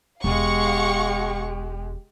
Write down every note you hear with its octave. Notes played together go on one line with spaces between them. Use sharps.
E1 G#3 G4 F5 F#5 C#6